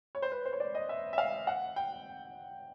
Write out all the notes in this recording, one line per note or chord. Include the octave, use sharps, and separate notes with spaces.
C#5
C5
B4
C5
C#5
D5
D#5
E5
E5
F5
F#5
G5